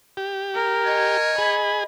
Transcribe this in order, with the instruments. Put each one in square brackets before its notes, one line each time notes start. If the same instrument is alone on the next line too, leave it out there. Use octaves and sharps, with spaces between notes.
[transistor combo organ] G4
[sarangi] A#4
[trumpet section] C#5 G#5 [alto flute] D#5
[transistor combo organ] G#4 [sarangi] B5